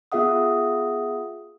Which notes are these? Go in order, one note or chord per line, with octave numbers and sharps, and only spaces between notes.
B3 F4 G#4 E5 F#5 D#6